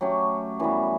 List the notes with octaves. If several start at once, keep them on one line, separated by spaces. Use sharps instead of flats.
F#3 A3 C#4 G4
F#2 E3 G3 B3